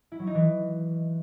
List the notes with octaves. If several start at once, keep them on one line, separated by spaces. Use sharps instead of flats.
E4
F#3
D#4
E3